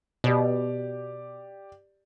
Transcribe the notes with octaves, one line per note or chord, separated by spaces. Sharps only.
B2 G4 D5